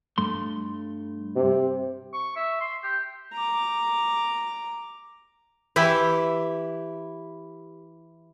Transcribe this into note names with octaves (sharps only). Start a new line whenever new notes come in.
G2 A3 C6
C3
C#6
E5
C6
G4
A#5 D6
E3 E4 G4 E5